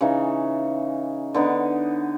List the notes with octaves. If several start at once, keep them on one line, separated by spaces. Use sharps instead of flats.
C#3 E3 C#4 D#4
D3 B3 D#4